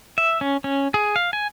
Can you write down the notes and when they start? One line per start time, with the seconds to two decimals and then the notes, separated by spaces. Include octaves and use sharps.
0.18 E5
0.41 C#4
0.64 C#4
0.94 G#4
1.16 F5
1.33 G#5